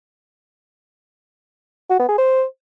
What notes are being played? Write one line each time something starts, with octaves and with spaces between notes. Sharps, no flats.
F#4
B3
G#4
C5